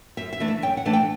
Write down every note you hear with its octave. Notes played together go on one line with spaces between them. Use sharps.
F#2 E5
E5
E3 A3 D4
E5
F#2 G5
F#5
E3 A3 D4
G5